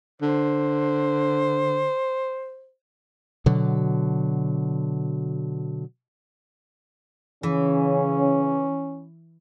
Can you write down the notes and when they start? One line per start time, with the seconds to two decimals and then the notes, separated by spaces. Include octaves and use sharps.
0.22 D3 C5
3.46 B2 D3 F#3
7.43 C#3 E3 C#4